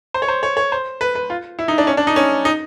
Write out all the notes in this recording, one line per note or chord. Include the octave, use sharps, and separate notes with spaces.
C5
C#5
C5
C#5
C#5
C5
B4
B4
F4
E4
D#4
D4
C#4
D4
D#4
C#4
D#4